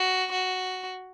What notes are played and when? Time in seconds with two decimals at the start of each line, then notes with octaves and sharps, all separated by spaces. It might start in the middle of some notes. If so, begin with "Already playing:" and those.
Already playing: F#4
0.32 F#4